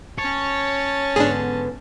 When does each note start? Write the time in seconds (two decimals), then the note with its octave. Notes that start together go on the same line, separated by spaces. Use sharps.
0.18 C#4 C#5 A5
1.16 G#2 D3 B3 D4 G#4